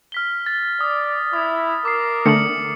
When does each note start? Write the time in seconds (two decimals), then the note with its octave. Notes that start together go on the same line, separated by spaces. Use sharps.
0.12 F6 B6 G7
0.46 A6
0.81 D5 D#6
1.33 E4 D#6
1.85 A#4 D6 D#6 C7
2.26 D3 A3 C#7 F#7